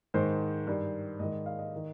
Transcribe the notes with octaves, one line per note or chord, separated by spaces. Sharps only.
G#2 D#3 C5
G2 D#3
G#2 D#3 D#5
F5
D#5
D#3